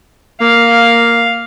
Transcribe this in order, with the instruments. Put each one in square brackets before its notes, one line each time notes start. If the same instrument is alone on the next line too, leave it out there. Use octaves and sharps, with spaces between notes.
[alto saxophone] A#3 [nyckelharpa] F5